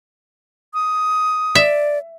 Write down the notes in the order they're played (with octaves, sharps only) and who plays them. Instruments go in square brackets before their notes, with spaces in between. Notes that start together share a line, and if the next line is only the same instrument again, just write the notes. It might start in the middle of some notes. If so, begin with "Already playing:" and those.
[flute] D#6
[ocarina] D5 [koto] E5